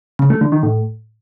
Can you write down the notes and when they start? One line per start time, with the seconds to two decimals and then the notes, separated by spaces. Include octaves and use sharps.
0.19 C#3
0.30 A3
0.41 D3
0.52 D#3
0.63 A2